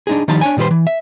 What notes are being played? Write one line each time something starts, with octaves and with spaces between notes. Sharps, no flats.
D4 D#4 G#4
D#3 F3 G3 D#4 A5
D4 C#5 G#5
A#2 D#3 G3 B4 C5
E3
E5